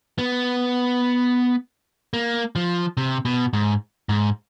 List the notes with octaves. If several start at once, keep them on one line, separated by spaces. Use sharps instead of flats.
B3
A#3
F3
C3
B2
G#2
G#2